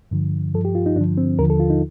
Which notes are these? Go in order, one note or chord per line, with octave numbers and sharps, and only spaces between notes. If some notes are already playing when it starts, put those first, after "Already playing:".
G2 D3 F3
G2 F3 A4
G4
F4
D#4
G2 D3 F3 D4
C4
D#2 D3 F3 A#4
A4
F4
D#4